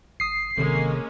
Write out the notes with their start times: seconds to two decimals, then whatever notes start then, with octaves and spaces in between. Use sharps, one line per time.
0.20 G#1 D#6 C7
0.58 G1 C3 D#3 G#3 A#3 C#4 A4